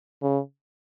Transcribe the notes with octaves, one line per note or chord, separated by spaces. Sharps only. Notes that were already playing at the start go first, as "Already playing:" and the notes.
C#3